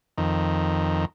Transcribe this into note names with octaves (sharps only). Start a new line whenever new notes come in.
F2 D#3